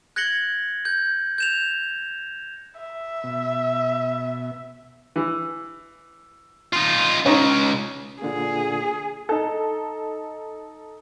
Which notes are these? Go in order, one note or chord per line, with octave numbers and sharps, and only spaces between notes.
F#6 G#6 A#6 C#7 F#7 G7
G6
G6 E7 F7
E5
B2
E3
D#4 F4
C#2 C#3 C#4 D#4
A#2 D3 A#3 G#4
D#4 A4